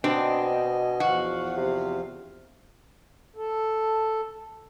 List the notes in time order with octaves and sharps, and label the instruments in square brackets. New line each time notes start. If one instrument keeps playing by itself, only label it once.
[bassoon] B2 [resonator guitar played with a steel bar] C4 [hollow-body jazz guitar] D4 [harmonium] D#5 G#5
[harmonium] E2 F3 F5 [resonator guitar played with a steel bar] F#4
[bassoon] C3
[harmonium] A4